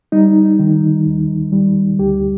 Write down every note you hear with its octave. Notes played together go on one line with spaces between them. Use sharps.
G3 D#4
D#3
D#2
G3
D2 G4